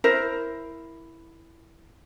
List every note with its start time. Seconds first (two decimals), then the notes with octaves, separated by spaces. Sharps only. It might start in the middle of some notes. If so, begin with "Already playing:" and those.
0.04 E4 A#4 C5